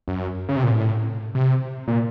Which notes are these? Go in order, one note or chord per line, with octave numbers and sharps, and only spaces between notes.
F#2
C#3
C3
A#2
A2
C3
A#2